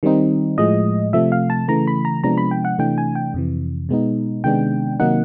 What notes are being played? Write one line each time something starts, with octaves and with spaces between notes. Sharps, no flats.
D#3 G3 C4 D#4
A2 F3 G#3 D#5
C3 F3 A3 E5
F5
A5
C#3 E3 A3 A#5
B5
A#5
C3 F3 G#3 B3 D4 A#5
B5
G5
F#5
C3 E3 A3 D4 G5
G#5
G5
F2 C3 E3
B2 G#3 B3 D#4
C3 D#3 G#3 B3 D4 G5
C3 D#3 F#3 A#3 D#4 F#5